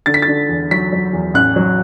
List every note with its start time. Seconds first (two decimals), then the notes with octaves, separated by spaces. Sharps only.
0.06 D3 A6
0.14 B6
0.22 A6
0.28 D3
0.49 E2
0.71 F#3 B6
0.93 F#3
1.13 E2
1.34 A1 F#6
1.56 F#3